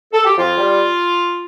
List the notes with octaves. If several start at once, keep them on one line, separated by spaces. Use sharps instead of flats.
A4
G4
F2 F4
G3